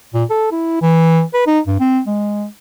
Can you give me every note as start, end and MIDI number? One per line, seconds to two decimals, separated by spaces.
0.14 0.24 46
0.30 0.50 69
0.52 0.78 64
0.82 1.22 52
1.34 1.46 71
1.47 1.60 63
1.67 1.77 43
1.80 2.00 60
2.07 2.45 56